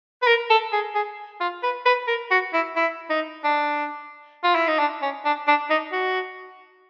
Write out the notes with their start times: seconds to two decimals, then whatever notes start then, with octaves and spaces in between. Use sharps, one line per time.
0.23 B4
0.27 A#4
0.50 A4
0.73 G#4
0.95 G#4
1.41 F4
1.63 B4
1.86 B4
2.08 A#4
2.31 F#4
2.54 E4
2.76 E4
3.10 D#4
3.44 D4
4.44 F4
4.55 E4
4.68 D#4
4.79 D4
5.02 C#4
5.25 D4
5.48 D4
5.70 D#4
5.92 F#4